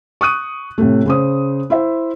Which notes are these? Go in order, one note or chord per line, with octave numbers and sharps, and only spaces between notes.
C#6 D#6 F#6 D#7
A2 C3 A3
C#3 C5 D#6
E4 C5 E5